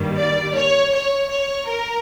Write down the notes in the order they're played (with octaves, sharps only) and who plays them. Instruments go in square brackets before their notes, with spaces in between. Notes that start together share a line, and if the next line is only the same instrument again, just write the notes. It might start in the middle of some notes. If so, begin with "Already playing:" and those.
Already playing: [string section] G2 D#3 G3 A#3
D5
C#5
C#5
C#5
A#4